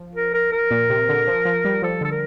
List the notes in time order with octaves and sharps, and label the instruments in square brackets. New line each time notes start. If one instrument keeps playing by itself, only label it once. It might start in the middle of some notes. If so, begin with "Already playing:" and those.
Already playing: [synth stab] F3
[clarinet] A#4
A#4
A#4
[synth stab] A#2
C3
D3
F3
F3
G3
[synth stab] F3 [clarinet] A4
[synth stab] D3 [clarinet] A4
[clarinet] A#4